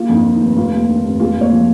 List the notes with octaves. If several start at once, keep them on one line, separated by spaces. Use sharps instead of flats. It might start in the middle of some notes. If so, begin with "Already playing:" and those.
Already playing: A#3 F4
F2
D#4
D#3
D#4
F1
F1 F4
D#2
D#3
F1
G#3 F4
A#2
C#5
F3